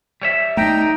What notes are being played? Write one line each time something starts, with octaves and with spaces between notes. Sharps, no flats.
G3 C#5 E5
A3 D#4 G5 A#5